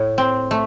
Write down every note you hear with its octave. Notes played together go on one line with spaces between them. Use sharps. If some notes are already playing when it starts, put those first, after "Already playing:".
Already playing: A2
C4
A3